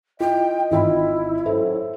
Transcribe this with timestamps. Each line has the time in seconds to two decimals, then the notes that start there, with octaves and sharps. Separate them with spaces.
0.20 E4 F4 D#5 G5
0.71 G#1 E4 F4 B5
1.46 F#2 A2 A4 C5 E5